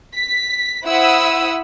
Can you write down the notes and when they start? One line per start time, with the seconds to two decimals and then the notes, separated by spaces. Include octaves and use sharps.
0.14 B6
0.85 E4 C5 F#5 B5 D#6 E6